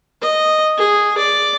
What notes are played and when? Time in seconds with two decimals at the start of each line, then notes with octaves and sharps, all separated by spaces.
0.22 D#5
0.78 G#4
1.18 D5